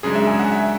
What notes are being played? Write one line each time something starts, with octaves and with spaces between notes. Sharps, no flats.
F#2 C#3 G#3 D4 G#4
E5
G#5
F#5
E5